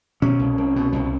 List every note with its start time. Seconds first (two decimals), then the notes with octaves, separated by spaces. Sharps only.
0.22 B2 C#4
0.39 C2
0.58 C2
0.76 B2
0.93 C2